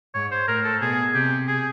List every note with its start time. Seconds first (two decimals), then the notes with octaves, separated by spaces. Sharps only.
0.14 G#2 C#5
0.32 C5
0.48 A2 A#4
0.65 A4
0.81 B2 G#4
1.14 C3 G4
1.47 G#4